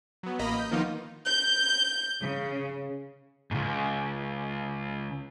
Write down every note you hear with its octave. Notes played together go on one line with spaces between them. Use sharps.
F#3 B3
A1 A#3 D#5 A#5 B5
D#5 G6
D#3 F3 A#3 B3 D#4 F4
G6
C#3
C#2 G#2